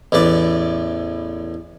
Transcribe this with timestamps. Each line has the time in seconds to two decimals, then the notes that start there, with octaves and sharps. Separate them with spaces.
0.12 A1 E2 B4 D5